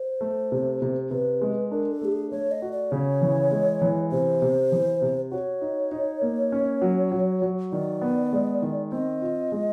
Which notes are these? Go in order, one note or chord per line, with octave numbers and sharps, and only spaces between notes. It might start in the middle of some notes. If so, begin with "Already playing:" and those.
Already playing: C5
A3
C3
C3
C3 B4
G#3
D4 A#4
A4
A3 G4
G#4
A3 C#5
D#5
F#4
D5
C#3 C#5
E3
G#3
E3
C3 C5
C3
E3
C3
F#4 C#5
D#4
D#4
A#3
C#4
F#3
F#3
F#3
D#3 D5
B3
G#3
D#3
C4 D#5
F4
G#3